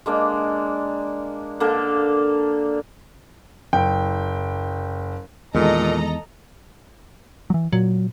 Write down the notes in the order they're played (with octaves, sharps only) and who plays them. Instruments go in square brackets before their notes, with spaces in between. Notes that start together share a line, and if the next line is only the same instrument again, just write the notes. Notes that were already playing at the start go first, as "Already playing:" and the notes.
[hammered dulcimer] G#3 A#3 D4
D3 A#3 A5
[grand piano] F#1 G5
[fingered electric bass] E2 [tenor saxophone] A#2 [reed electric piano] D#3 G#3 [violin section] A4 D#5 A#5
[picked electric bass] E3 F#3
[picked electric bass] A#2 [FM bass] F#3